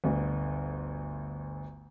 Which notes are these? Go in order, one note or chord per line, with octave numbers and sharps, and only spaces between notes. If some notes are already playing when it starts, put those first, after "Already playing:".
G1 D2